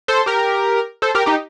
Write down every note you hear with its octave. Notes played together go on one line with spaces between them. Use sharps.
A4 C5
G4 A#4
A4 C5
G4 A#4
D#4 G4